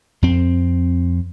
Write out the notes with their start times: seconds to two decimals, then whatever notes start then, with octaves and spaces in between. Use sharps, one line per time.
0.22 F2 C4